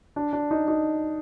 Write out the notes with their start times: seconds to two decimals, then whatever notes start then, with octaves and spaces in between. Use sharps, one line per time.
0.16 D4
0.33 D4
0.51 D#4
0.68 D#4